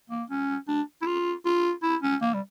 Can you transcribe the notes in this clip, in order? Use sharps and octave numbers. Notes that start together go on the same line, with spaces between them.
A#3
C#4
D4
E4
F4
F4
E4
C#4
A#3
G3